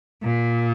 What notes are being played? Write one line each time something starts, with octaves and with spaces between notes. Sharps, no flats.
A#2